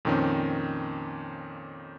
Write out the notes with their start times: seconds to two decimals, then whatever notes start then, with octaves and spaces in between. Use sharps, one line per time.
0.05 F2 A#2 D#3 C4 C#4